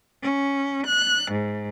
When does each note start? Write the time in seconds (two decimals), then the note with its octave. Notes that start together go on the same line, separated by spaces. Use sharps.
0.22 C#4
0.87 F#6
1.31 G#2